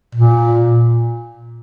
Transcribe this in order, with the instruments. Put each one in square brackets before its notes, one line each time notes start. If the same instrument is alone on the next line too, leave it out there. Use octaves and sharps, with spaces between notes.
[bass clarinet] A#2